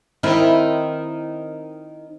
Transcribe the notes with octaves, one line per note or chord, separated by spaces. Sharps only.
D#3 C4 E4